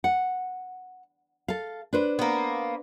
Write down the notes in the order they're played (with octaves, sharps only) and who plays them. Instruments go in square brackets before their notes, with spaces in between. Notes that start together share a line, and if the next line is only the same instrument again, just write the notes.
[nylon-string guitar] F#5
A4 F5
D4 B4 C5
[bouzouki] A#3 B3